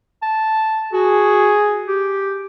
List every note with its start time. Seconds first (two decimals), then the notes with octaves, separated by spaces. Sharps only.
0.22 A5
0.93 F#4 G#4
1.87 G4